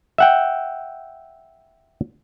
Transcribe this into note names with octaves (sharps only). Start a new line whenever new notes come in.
E5 F#5 G5